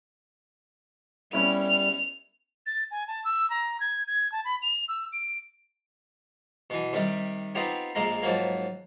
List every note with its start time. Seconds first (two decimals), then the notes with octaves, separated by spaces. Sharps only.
1.33 G3 B3 C#4 E4 F7
2.66 A6
2.91 G#5
3.08 A5
3.25 E6
3.50 A#5
3.80 G#6
4.07 G#6
4.32 A5
4.45 B5
4.62 F7
4.88 E6
5.13 D7
6.70 B2 E3
6.93 C3 D#3 G3
7.55 B3 C4 D#4 F4 G4 C5
7.95 A#1 G#3 A#3 A#5 C6
8.23 G#2 F3 F#3 A#3